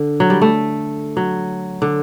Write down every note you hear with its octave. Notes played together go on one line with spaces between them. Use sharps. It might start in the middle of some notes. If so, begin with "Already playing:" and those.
Already playing: D3
F#3
G3
A3
F#3
D3